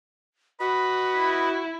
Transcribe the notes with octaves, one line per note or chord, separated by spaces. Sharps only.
F#4 B4 D#5 B5
E4